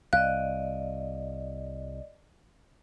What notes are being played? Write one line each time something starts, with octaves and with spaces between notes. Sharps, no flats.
C2 D5 D#5 F5 F#6